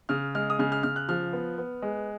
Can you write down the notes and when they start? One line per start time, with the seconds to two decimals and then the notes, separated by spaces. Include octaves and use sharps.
0.09 C#3 F6
0.35 G#3 F6
0.50 D#6
0.59 C#3 F6
0.72 F6
0.83 C#3 F6
0.96 F#6
1.09 F3 F6
1.33 B3
1.58 B3
1.82 G#3